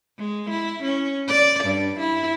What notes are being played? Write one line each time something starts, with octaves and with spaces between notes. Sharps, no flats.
G#3
E4
C#4
D5
G2
E4